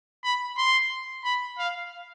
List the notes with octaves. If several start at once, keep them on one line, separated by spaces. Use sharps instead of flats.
B5
C6
B5
F5